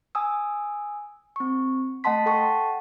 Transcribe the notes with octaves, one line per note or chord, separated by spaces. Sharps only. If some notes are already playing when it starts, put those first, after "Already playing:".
G#5 D#6 E6
C4 C#6
A3 D#5 F#5 A5 C6 B6
A4 F#5 G5 A5 C#6